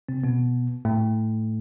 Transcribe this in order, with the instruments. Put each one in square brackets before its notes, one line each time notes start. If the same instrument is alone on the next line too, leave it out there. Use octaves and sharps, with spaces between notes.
[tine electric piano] C3 C4
B2 B3
A2 A3